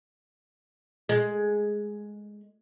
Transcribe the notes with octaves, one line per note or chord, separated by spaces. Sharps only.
G#3